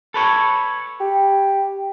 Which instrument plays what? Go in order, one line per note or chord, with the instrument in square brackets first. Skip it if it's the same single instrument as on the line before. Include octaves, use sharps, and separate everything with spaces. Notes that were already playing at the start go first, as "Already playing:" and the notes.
[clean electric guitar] A4 B4 C#5
[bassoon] G4